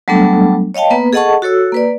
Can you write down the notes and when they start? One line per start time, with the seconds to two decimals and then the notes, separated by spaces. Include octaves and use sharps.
0.08 F#3 G3 A3 B3 D4 A4
0.74 C#5 D#5 F5 G5 A5
0.90 A#3 B3 B4
1.13 G#4 A4 D#5 F#5 A5 C#6
1.42 F#4 A4 C#5 E6
1.72 A#3 B4 D5